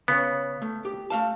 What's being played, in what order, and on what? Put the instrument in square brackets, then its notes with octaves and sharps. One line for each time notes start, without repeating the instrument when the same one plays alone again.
[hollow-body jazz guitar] C#3 C#5 [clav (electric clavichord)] B3
[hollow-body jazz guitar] A3
G4
A3 F5 A5